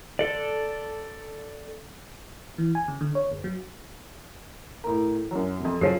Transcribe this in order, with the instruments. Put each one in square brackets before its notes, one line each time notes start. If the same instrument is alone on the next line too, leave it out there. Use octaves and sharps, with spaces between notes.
[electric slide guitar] A4 D5
[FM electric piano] E3
G#5
C#3
D3
C#5
G1
F#3
[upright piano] A2 A#4
F#2 F#3
F2 C3
[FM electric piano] F#2 C#3 F3 [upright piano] C7